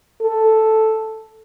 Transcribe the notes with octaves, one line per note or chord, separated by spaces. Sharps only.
A4